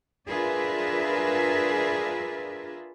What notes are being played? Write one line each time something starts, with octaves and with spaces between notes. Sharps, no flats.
D4 F4 G#4 A#4 B4 E5